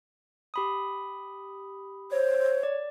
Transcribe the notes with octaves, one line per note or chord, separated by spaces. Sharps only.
G4 B5 D#6
C5 C#5
D5